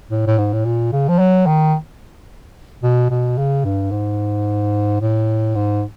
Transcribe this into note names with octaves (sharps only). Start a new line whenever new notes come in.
A2
A2
G#2
A2
A#2
C#3
F3
F#3
D#3
B2
B2
C#3
G2
G#2
A2
G#2